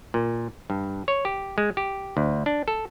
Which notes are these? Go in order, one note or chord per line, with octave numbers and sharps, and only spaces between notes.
A#2
G2
C#5
G4
G#3
G4
D2
D4
A4